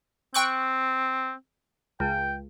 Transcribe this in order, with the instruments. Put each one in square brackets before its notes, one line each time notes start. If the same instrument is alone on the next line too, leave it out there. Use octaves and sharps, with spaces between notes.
[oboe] C4 [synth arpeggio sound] G5 C#6 F#6
[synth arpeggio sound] C#2 [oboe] G5